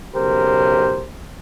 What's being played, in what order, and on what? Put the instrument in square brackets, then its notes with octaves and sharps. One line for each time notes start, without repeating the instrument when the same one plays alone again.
[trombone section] B1 C#3 G4 A#4 C5